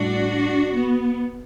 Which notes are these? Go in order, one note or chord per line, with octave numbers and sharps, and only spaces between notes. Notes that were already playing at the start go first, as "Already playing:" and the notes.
Already playing: A2 G3 D4 F#4
B3